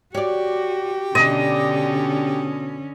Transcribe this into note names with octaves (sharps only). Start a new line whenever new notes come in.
F#4 G4 C#5 D5
B2 D3 C#4 D4 D#5